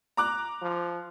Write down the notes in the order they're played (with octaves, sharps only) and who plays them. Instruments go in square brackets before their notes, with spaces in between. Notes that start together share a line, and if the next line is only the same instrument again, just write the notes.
[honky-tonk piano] A#5 D6 F#6
[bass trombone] F3